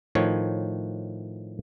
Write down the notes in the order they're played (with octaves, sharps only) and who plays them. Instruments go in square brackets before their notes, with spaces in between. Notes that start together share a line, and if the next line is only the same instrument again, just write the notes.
[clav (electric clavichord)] A2 D#3 F3 C#5